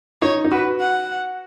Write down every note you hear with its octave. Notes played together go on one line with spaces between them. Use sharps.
D#4 C#5
D#4
F#4 B4
F#5